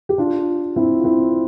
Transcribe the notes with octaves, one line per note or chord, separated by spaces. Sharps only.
G4
D4 F4
C4 E4
F4
C4 E4